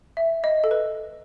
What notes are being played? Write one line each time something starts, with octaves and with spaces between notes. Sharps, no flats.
E5
D#5
A4
B4